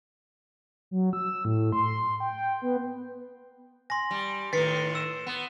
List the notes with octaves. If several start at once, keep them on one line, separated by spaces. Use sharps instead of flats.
F#3
E6
A2
C6
G5
B3
G#5 C6 A#6
G3
A2 D#3 B4 A6 C7 C#7
E6 E7
B3